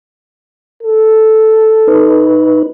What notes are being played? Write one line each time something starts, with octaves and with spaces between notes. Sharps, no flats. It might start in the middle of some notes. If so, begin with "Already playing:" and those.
A4
D#4 B4